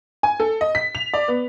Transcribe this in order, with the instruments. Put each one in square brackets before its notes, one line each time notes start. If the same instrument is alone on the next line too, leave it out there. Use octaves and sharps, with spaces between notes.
[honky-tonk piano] G#5
A4
D#5
B6
F7
D5
B3